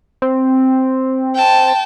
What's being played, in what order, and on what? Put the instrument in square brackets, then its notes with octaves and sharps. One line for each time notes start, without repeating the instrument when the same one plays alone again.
[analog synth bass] C4
[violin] G5 A5